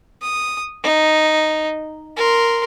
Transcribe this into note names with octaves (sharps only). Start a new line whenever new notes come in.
D#6
D#4
A#4 C6